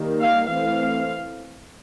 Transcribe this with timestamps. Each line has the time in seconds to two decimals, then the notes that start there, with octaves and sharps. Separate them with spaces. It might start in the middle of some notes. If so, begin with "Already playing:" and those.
Already playing: D#3 G3 A#3
0.20 F5
0.49 E3 A3 C4 F5